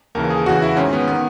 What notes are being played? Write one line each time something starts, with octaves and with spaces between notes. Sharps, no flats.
D#2 C#3 E3 A#4
G#4
E2 C#3 E3 F#4
E4
G#2 D#3 C#4
B3
D#3 B3